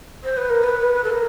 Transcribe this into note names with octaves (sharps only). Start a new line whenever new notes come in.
C5
B4
A#4
B4
A4
A#4